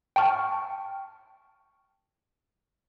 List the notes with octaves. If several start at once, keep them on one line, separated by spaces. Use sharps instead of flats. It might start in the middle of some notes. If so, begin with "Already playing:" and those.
G5 A5 C#6 F6